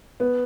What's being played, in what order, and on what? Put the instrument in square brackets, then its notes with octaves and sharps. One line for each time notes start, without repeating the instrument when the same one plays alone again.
[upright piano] B3